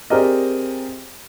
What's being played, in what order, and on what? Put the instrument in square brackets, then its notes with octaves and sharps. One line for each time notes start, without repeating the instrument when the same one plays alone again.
[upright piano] C4 G4 G#4 A#4 D5 D#5